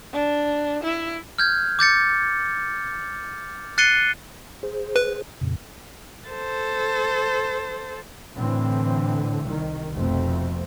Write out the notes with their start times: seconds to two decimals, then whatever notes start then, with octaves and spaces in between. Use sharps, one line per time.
0.13 D4
0.83 E4
1.38 F6 G6 G#6
1.79 D6 G6 A6 C#7
3.78 F#6 A6 C7 C#7 D#7 G7
4.63 G#4 C5
4.96 B4
5.41 F2 A#2 C#3
6.29 A4 C5
8.36 A2 D3 E3 C4
9.44 C2 D#3
9.93 F1 F2 B2 A3 C4